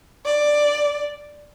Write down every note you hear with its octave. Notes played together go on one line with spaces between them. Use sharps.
D5